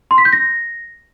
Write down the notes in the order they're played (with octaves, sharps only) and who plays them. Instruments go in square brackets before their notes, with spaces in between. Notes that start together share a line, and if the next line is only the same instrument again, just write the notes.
[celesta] C6
B6
G6
A#6